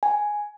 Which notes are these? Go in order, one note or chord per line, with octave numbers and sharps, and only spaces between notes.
G#5